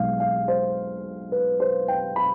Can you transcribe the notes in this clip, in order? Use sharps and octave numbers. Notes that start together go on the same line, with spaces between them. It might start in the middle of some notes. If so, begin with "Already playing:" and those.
Already playing: B1 B2 G#3 F5
F5
C5
B4
C5
G5
B5